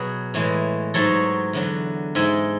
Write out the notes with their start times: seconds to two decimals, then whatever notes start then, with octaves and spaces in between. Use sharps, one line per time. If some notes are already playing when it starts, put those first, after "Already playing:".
Already playing: B2 F#3 G#4 B4
0.34 A2 E3 G#3
0.94 G#2 F#3 A4 C#5
1.53 E2 D3 F#3
2.15 G#2 G#3 E5 G#5